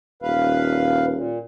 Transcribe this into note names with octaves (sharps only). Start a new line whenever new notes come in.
D#1 B4 F5
A#2